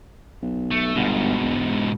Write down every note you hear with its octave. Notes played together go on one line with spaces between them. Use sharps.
B1
A3
G1 G#2 B2
E1